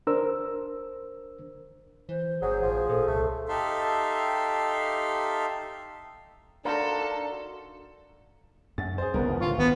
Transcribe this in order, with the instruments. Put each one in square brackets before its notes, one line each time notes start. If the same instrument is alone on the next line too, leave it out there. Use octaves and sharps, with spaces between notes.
[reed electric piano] D4 A#4 C5 E6
[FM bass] E3 [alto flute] C5
[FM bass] G1 [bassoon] F#3 [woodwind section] G#4
[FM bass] A1 [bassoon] F3
[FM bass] A#2 [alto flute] A4
[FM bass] C2 [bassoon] A3
[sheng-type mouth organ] D#4 G4 A4 E5 F5 C6
[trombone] D4 [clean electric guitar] D#4 F#4 A#4 [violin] A4 [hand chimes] D5 F5 C6
[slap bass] F#2 [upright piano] A6
[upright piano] G#4 C5
[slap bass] G1 C2 [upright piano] B3 A#4
[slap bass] E2 C#3 F3
[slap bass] A2 D3 [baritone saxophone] F4 [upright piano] C#6
[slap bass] G#1 D#3 F3 [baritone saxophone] B3